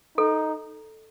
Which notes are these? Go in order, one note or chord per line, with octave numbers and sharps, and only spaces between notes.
D#4 A4